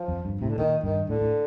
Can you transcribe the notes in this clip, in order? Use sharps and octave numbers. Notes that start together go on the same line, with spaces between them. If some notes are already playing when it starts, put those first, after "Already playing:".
Already playing: F3
F2
G2
A2 C3
D3
A#2 D#3
G2 D#3
A2 D3
A2